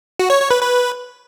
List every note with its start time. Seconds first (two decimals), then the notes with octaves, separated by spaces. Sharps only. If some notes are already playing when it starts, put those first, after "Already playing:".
0.19 F#4
0.30 C#5
0.40 C#5
0.51 B4
0.61 B4